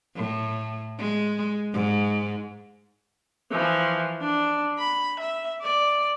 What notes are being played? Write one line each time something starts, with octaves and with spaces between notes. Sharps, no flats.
A2
G#3
G#2
E3 F3
D4
B5
E5
D5